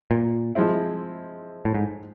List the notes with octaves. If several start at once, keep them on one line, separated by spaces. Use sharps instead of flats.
A#2
F3 G#3 C4 E4
A2
G#2